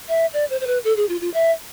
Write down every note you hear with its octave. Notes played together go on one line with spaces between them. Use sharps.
E5
D5
C5
C5
B4
A4
G#4
F4
F4
E5